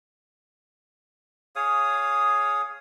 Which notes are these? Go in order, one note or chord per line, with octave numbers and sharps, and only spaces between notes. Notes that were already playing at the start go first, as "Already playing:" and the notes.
G#4 C#5 F5 D#6